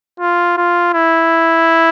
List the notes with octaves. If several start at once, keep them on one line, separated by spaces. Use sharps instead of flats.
F4
F4
E4